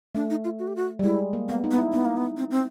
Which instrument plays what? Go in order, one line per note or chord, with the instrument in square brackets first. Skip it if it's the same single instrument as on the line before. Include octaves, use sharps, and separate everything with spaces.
[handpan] A3 [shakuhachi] D4
[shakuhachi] D#4
F4
F#4
G4
F#4
[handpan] G3
[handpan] G#3 [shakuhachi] E4
[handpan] A#3
[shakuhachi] A#3 [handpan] B3
[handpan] D#4
[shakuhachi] B3
[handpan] E4
[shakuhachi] B3 [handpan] D#4
[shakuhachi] A#3
B3
C4
C4